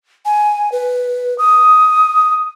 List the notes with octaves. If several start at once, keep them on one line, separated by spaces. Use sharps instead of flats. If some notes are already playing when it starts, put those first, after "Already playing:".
G#5
B4
D#6